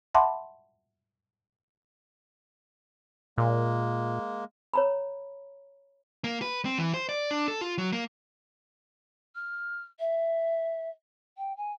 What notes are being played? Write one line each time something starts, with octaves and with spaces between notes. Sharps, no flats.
E5 F#5 A5 B5 C6 D6
A#2 G#3 A#3
C#5 A#5 B5
A#3
B4
C4
E3
C5
D5
D4
A4
F4
F#3
A#3
F6
E5
G5
G#5